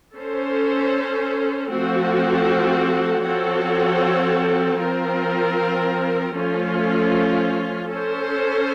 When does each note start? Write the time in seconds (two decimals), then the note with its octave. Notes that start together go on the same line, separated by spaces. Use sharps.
0.15 C#4 A4 C5
1.70 F3 A3 C4 F#4 A4
3.25 F3 C4 F#4 A4 C#5
4.80 F3 C4 F4 A#4
6.36 F3 A3 C#4 F4
7.91 C#4 A4 C5